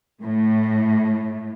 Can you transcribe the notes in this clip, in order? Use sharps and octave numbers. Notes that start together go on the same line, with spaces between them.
A2